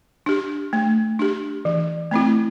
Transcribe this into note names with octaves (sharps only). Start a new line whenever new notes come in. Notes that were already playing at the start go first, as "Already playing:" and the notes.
D4 G4
A3
D4 G4
E3
A3 C4 E4